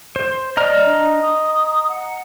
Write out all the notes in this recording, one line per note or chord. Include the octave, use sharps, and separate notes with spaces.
C5
D5 D#5 A#5 F6
D4
D#6
F#5